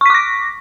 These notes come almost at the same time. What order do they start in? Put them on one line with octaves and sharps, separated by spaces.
C#6 B6 D6 A#6